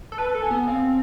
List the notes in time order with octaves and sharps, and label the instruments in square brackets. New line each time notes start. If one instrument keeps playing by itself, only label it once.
[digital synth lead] A4
[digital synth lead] B4 [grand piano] A5
[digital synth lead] A4
[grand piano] G#5
[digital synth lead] B3
[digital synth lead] C4 [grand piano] F5